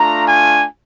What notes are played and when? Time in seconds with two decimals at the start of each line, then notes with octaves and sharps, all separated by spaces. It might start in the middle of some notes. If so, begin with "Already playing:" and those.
Already playing: A3 D4 F4 A#5
0.26 G#5